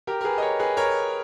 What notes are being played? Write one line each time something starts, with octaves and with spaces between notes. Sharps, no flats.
G4 A#4
A#4
G#4 B4
D#5
A#4 C#5
G#4 B4
A#4 C#5